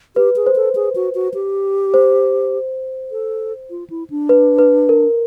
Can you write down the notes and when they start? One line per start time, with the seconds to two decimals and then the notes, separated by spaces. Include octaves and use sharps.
0.16 G4 B4
0.36 G#4
0.46 C5
0.56 A4
0.75 G#4
0.95 F#4
1.15 F#4
1.34 G4
1.94 C5
3.11 A4
3.70 F4
3.90 E4
4.10 D4
4.29 B4
4.58 B4
4.89 A#4